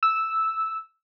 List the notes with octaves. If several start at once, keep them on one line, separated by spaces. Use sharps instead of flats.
E6